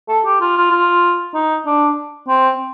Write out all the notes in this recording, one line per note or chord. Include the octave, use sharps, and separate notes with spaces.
A4
G4
F4
F4
F4
D#4
D4
C4